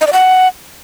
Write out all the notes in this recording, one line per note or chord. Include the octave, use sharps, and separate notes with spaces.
D#5
D5
F#5